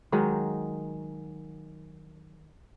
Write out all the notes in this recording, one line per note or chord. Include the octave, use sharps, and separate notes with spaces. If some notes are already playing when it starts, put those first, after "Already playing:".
D#3 F#3 G#3 D#4